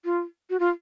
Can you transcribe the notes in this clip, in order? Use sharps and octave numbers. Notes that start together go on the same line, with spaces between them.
F4
F#4
F4